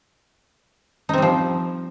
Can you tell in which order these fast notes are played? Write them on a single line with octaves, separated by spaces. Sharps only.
D#4 C4 G3 F3